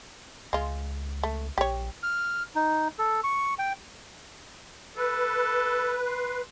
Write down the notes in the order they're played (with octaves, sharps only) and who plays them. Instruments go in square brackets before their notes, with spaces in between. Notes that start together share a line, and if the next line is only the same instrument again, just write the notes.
[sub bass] C#2 [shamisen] G#3 F4
[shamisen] A3
[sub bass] A#1 [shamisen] G4 C#5
[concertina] F6
D#4
A4
C#6
G5
[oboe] A4 [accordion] B4
[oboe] C6